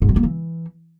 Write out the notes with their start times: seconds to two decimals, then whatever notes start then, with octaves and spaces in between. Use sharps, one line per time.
0.02 G#2
0.09 F#3
0.16 A#3
0.23 E3